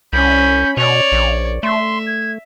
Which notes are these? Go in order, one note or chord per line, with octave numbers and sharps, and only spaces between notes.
C2 C#4 B5 G6
B2 C#5 D5 F7
A#1
A3 E5 C6
G#6